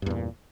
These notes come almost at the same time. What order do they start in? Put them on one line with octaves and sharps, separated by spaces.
G2 E2 A#2